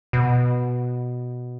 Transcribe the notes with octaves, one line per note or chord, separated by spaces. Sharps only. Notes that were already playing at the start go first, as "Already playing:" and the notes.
B2